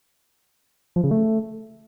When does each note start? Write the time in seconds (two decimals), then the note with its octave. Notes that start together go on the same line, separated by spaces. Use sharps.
0.96 F3
1.04 C#3
1.11 A3